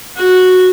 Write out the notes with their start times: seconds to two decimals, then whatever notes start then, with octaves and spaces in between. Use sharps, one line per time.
0.16 F#4